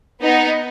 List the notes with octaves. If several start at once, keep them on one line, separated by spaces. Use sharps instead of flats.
B3 D#4